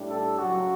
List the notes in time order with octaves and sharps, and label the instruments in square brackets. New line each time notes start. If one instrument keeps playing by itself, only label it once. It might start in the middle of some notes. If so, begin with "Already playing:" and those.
Already playing: [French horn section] A2 G3 D4
[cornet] A4
[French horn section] F#2 C#3 F#3 [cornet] F#4